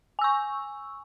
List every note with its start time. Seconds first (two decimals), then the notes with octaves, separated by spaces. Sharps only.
0.19 G#5
0.21 E6
0.24 C#6